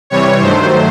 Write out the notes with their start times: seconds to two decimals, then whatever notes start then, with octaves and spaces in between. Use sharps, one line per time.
0.10 C3 E3 G3 C#5
0.40 G2 D#3 F#3 A3 C5